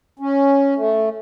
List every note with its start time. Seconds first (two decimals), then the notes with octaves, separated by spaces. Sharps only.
0.19 C#4
0.76 A3